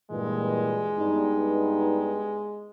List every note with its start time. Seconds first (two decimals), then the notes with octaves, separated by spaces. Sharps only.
0.11 G2 A#2 E3 G#3
0.98 G2 B3 D#4